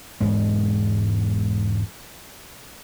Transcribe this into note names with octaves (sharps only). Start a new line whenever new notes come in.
E1 G#2 G#3